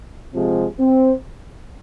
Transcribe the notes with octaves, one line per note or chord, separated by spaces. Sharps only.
C3 F3 G#3
C4